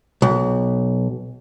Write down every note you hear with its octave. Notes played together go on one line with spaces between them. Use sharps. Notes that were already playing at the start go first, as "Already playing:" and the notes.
B1